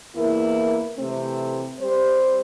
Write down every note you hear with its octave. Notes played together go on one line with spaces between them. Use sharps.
E2 E3 A#3 E4 A#4
C3 E3 A3 C4
G3 C4 G4 C5